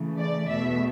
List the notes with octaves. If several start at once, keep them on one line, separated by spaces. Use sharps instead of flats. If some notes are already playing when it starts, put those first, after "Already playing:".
Already playing: C#3 E3 A3
D5
E2 B2 A3 E5